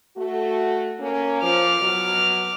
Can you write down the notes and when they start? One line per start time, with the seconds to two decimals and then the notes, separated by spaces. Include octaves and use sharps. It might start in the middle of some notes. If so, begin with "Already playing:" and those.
0.17 A3 F#4
0.99 A#3 C#4
1.42 F3 D6 F6
1.80 B2 F#3